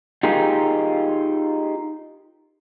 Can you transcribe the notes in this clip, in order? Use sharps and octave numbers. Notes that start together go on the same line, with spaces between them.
D#4 F4 G4 G#4 A#4